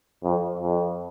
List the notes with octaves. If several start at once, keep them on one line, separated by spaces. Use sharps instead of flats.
F2
F2